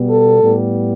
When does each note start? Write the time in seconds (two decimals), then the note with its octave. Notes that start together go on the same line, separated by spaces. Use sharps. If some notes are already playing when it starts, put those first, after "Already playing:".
Already playing: B2 G3 B3
0.10 A4
0.42 A2 G3 B3